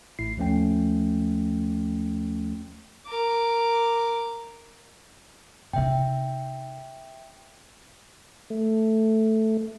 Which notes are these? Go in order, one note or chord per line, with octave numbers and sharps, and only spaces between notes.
A1 A2 E4 C7
D#2 F3 A3 C#4 G5
A#4 D6
C3 D#4 E5 G5
A3